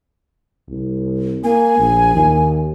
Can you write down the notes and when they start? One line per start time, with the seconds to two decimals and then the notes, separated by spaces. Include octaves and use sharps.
0.69 C2
1.44 A#3 G#5
1.78 A#1
2.15 D#2